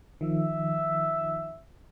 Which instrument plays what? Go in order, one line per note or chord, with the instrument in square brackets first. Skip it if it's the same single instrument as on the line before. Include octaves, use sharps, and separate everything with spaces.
[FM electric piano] D#3 F3 [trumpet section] E5